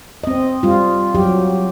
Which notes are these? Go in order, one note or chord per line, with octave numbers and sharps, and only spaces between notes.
C4 D#5
G3 F4
F#3 G4